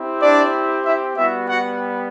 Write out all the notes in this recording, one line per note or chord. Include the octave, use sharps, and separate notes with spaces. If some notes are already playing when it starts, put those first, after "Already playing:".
Already playing: C4 E4 G4
D4 D5
E4 E5
G3 B3 E4 F#4 E5
F#4 F#5